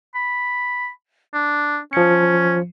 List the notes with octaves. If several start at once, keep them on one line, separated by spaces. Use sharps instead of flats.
B5
D4
F3 C#4 C#7